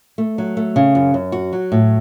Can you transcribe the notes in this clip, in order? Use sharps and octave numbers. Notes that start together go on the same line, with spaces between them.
A3
F#3
A3
C#3
F#2
F#2
F#4
F#3
A2